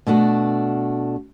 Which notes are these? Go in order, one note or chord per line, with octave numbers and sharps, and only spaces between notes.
B2 A3 D4 F#4